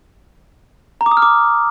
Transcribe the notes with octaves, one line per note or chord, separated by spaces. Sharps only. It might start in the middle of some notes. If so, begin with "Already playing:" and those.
A#5
D6
D#6
F6
D6